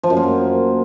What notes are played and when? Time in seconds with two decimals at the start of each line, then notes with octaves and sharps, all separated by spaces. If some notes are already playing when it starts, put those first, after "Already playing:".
0.03 F3
0.10 F#2
0.17 A#3